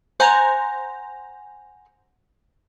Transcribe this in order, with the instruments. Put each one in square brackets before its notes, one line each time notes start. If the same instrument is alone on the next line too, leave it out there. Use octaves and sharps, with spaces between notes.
[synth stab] C5 A#5 [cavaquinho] F#5 G#5 C6